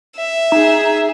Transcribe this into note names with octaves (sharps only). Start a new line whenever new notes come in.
E5
D#4 G#4